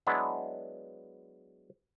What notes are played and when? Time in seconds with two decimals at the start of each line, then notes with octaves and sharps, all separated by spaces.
0.07 F#3 G#3 B3 D4 E4